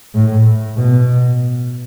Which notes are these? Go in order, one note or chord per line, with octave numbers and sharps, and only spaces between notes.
A2
B2